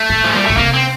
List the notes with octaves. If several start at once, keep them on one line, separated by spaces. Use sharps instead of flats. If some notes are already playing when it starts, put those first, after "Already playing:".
Already playing: A3
A2
F3
A#2 G3
A#2 A3
C3 A#3
C4